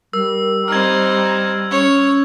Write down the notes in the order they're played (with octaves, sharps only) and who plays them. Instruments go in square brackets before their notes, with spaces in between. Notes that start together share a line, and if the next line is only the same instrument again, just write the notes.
[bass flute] G3 [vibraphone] A#4 [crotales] E6
[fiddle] C4 D#4 [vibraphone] A#5 [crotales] F6 G#6
[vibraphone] C#4 [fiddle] C#5